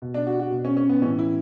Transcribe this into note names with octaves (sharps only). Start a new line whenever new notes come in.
B2
D4
F#4
F#4
B2
C#4
C#4
B3
A2 E3 C#4
E4